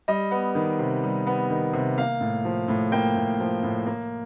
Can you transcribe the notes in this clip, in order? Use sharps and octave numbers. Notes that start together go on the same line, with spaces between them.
G3 D#5
B3
D#3
C3
G3
B3
D#3
C3
A#3 F5
A2
F3
A2
A#3 G5
A2
F3
A2
A#3